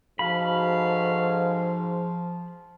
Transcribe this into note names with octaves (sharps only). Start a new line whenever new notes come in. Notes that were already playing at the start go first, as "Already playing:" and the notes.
G#2 F3 F#4 A4 F5 B5